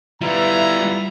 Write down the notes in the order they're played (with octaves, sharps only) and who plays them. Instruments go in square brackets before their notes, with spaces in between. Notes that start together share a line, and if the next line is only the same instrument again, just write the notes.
[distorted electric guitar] G3 B3 [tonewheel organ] E4 F4 [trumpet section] B4 E5 A#5